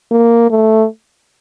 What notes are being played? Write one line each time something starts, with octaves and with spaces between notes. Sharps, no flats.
A#3
A3